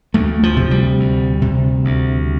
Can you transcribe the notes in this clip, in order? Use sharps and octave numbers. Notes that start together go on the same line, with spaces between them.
D2 A3
F3
C3
G3
D2
C3
D2